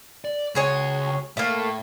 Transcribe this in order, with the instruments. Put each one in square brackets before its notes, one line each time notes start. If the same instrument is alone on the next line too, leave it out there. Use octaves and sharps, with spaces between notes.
[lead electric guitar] D5
[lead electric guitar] C#2 G#5 [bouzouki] F#4 G#4 C#5
[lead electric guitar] A2 [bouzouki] A3 A#3